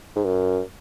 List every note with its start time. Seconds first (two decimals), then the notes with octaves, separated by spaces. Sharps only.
0.16 G#2
0.25 F#2